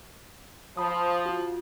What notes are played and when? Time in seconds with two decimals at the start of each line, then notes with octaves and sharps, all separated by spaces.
0.77 F3 A5 B5 D#6
1.26 F4 F#4